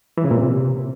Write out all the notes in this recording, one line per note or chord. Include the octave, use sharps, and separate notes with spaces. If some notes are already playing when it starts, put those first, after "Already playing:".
E3
C#3
A#2
C3